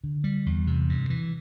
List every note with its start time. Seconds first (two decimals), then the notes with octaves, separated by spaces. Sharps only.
0.04 D3
0.24 G3
0.46 E2
0.67 C3
0.89 G2
1.10 E3